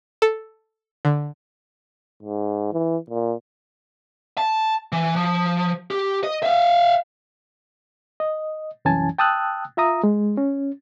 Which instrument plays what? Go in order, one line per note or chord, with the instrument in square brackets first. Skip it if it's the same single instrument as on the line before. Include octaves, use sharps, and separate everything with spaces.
[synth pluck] A4
D3
[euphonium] G#2
E3
A#2
[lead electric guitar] A5
E3
F3
G4
D#5
E5 F5
[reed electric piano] D#5
C2 F#2 E3 C#4 G#5 A5
G5 A5 D#6 E6 F#6
F4 E5 A#5 D#6
G#3
C#4